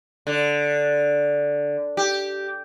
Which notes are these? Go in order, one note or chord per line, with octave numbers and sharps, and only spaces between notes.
D3
G4